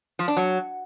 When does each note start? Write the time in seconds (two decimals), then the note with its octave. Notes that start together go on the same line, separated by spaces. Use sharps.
0.19 F3
0.28 D4
0.37 F#3